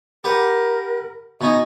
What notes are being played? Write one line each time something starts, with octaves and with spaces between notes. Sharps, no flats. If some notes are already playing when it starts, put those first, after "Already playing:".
G4 A#4 B4 F#5
B2 C#4 D#4 D#5